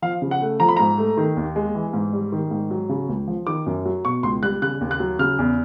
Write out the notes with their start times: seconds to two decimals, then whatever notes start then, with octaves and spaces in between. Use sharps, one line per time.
0.02 F3 F5
0.22 C#3
0.31 F#5
0.41 A3
0.60 F3 A#5
0.69 B5
0.77 G#2 A#5
0.98 A3
1.17 D#3
1.37 D#2
1.56 G#3
1.75 E3
1.93 G#2
2.13 G3
2.32 D#3
2.51 G#2
2.71 F#3
2.89 C#3
3.09 C#2
3.28 F3
3.47 D#3 D6
3.66 F#2
3.85 F#3
4.05 B2 C#6
4.23 C#2 C6
4.43 G3 F#6
4.62 C#3 F#6
4.81 D#2
4.91 F#6
5.00 F#3
5.19 C#3 F6
5.39 E2